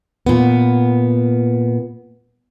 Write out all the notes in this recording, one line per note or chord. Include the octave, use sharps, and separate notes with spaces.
A#2 B3